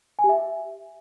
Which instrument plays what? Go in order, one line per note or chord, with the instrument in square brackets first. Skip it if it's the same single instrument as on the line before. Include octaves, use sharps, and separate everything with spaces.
[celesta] G#5
G4
E5